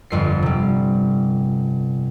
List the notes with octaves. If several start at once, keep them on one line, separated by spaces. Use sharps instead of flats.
G1 F2 C7
C3 G3